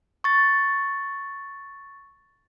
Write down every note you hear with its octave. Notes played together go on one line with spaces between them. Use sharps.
C#6 A6